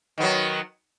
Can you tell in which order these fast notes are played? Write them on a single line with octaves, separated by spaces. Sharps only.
D#3 B3 F#3